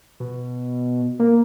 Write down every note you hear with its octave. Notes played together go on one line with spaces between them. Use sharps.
B2
A#3